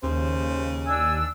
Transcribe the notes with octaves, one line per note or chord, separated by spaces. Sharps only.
D#2 C#3 C5
D4 G#5 E6